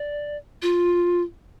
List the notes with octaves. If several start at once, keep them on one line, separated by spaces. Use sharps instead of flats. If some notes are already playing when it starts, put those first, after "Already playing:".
Already playing: D5
F4